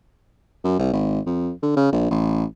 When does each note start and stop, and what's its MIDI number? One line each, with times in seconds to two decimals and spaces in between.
0.64 0.76 42
0.79 0.92 36
0.93 1.20 32
1.26 1.50 41
1.63 1.76 50
1.77 1.89 49
1.92 2.06 34
2.10 2.44 33